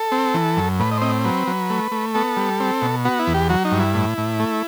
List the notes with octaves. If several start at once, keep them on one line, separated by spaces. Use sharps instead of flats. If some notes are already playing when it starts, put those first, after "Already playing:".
Already playing: A4
C4
E3
F#2
A2 B4
D#5
C5
C4 D#5
F#3 B4
F#3
A3
A3
B3 A4
G3
C4
B2
B3 F#4
E4
E2
G4
F#3 F#4
D#4
G2
E4
A2
A2
A3